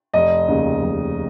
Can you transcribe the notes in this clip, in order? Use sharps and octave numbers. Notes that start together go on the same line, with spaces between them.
F1 D#5
D#2 C#3
F1